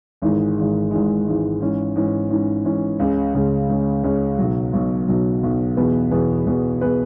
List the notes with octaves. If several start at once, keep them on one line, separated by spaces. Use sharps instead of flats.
G#1 G#2 E3 G#3
G#1 G#2 E3 G#3
G#1 G#2 E3 G#3
G#1 G#2 E3 G#3
G#2 E3 C#4
G#2 E3 C#4
G#2 E3 C#4
G#2 E3 C#4
C#2 C#3 G#3 C#4
C#2 C#3 G#3 C#4
C#2 C#3 G#3 C#4
C#2 C#3 G#3 C#4
B1 B2 F#3
B1 B2 F#3
B1 B2 F#3
B1 B2 F#3
E2 B2 B3 G#4 B4
E2 B2 B3 G#4 B4
E2 B2 B3 G#4 B4
B2 B3 G#4 B4